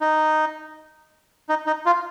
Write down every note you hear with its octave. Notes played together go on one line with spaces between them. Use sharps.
D#4
D#4
D#4
F4